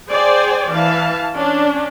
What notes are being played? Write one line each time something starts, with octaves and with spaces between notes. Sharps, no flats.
G#4 C5 D5 G5 G#5
E3 F5 A5
C#4 D4